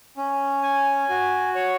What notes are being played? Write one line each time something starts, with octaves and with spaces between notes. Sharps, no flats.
C#4
G#5
F#4
C#5